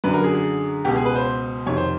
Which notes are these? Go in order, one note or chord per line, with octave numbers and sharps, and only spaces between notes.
F#2 D3 B4
A#4
G#4
G#4
C#2 B2 G4
G#4
B4
C5
F2 C3 D#3 C#5
C5